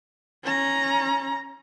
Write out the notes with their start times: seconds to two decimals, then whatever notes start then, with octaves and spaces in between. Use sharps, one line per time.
0.43 C#4 A#5